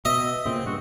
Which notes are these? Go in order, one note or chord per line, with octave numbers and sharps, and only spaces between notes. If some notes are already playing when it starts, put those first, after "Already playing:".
B2 D#5 E5
A#2 C#3 C4
G2 F#4